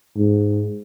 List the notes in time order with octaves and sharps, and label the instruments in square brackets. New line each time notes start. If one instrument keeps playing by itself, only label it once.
[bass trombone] G#2